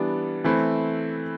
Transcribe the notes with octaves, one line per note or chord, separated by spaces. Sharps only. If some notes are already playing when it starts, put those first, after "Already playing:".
Already playing: E3 G3 B3 D4
E3 A3 C4 E4